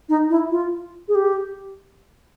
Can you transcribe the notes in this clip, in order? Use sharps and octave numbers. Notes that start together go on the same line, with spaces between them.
D#4
E4
F4
G#4
G4